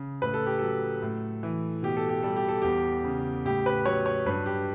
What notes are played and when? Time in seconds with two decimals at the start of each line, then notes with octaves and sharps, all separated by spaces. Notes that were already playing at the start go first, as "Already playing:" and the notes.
Already playing: C#3
0.22 A2 B4
0.34 A4
0.46 G4
0.59 F#3 A4
1.02 A2
1.43 E3
1.83 B2 G4
1.97 A4
2.09 G4
2.23 G3 A4
2.36 G4
2.49 A4
2.62 E2 G4
3.04 C#3
3.45 A2 G4
3.66 B4
3.85 F#3 C#5
4.06 C#5
4.26 G2 B4
4.46 G4